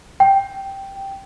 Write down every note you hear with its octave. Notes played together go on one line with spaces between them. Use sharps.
G5